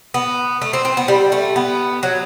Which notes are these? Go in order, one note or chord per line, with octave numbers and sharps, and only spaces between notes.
B3
A3
C4
C4
B3
G3
A3
B3
F#3